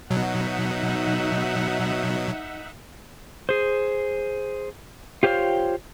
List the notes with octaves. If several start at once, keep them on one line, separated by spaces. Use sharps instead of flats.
B2 F#3 D#4 E5 F#5
G#4 C5
F4 G4 C5 C#5 F5 G5